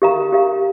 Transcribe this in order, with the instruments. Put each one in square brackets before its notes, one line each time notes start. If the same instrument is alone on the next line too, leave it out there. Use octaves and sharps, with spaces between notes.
[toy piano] G4 A#4 F5 A#5
G4 A#4 F5 A#5